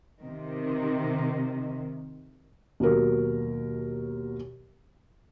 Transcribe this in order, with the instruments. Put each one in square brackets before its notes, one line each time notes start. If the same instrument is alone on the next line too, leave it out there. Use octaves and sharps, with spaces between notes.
[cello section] C3 D#3
[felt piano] D#2 B2 F#3 A#4